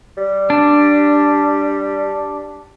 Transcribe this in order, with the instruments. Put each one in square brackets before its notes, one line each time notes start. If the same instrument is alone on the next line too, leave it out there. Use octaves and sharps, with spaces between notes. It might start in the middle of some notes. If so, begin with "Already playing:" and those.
[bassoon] G3
[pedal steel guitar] D4